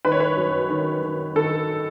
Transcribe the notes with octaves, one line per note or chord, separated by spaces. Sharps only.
D#3 B4
C#5
B4
F#2
D#3
D#3
D#3 A4